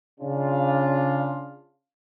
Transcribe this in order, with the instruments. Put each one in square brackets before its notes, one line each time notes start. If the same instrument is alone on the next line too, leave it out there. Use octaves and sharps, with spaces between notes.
[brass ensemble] C#3 D4 F4